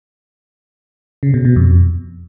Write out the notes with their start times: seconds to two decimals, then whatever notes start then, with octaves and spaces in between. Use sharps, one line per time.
1.23 C#3
1.34 B2
1.45 B2
1.56 F2